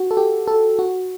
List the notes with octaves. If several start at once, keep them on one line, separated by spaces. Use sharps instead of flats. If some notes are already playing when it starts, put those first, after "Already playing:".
Already playing: F#4
A4
G4
A4
F#4